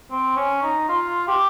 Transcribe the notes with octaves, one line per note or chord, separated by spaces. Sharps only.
C4
C#4
D#4
F4
G4